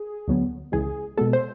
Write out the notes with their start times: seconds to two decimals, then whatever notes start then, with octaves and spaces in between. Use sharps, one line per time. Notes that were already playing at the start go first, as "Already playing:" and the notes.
Already playing: G#4
0.28 D2 D3 F#3 B3
0.72 C#2 C#3 E3 G#3 G#4
1.18 B2 G#3 B3 A4
1.33 C5